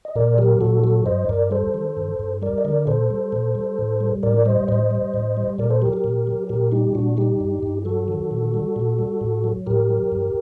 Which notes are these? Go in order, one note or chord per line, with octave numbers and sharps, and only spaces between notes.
D#5
A#2 A#4 D5
F#3 G4 A#4
A#2 F#4 A4
F#3 F#4 A4
G2 C5 D#5
G2 A#4 D5
G3 A4 C5
D#3
G2
G2
G3 A#4 D5
D#5
D3 A#4 D5
A#2 A4 C5
G3
A#2
G3
A2
G3
A2 A#4 D5
G3 C5 D#5
A2 C5 D#5
G3
A2
G3
A#2 A#4 D5
A4 C5
F#3 G4 A#4
G4 A#4
A#2
F#3
A#2 G4 A#4
G3 D#4 G4
A#2 D4 F#4
G3 D#4 G4
G2
G2
F#3 F#4 A4
D#3
A#2
G3
A#2
G3
A2
F#3
A2 G4 A#4
F#3
G2